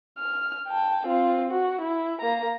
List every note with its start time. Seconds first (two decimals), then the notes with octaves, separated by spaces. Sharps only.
0.19 F6
0.68 G5 A5
1.07 C4 F4
1.51 F#4
1.81 E4
2.21 A#3 A#5